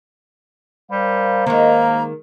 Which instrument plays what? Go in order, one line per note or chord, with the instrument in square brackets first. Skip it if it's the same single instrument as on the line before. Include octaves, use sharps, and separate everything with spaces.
[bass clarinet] G3 [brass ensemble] A#4 C5 F5
[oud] D#3 G#3 [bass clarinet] A#3 [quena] A#5